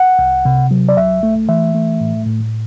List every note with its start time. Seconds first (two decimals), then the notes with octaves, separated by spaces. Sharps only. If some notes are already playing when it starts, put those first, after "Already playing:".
Already playing: F#5
0.19 C2
0.45 C3
0.71 F#3
0.89 D5
0.97 C2 E5
1.23 A3
1.49 E3 E5
1.75 A3
2.00 A2
2.26 A2